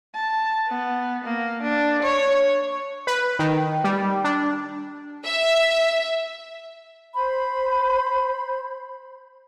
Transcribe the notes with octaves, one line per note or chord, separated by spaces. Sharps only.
A5
B3
A#3
D4
C#5
B4
D#3
G3
D4
E5
C5 B5